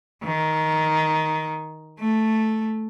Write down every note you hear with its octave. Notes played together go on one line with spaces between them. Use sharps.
D#3
A3